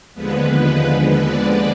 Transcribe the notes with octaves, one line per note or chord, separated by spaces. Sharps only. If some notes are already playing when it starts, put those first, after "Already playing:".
D#2 D3 F3 G#3 B3 B4
D5